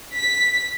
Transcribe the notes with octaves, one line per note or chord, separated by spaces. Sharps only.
B6